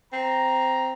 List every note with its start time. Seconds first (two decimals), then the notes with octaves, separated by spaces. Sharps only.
0.13 C4 A#5